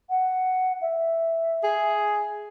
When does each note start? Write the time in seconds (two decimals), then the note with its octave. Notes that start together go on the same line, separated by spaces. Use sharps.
0.09 F#5
0.81 E5
1.64 G#4